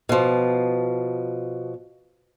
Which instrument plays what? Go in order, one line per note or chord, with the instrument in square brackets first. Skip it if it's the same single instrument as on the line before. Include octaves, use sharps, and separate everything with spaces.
[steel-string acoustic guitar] B2 F3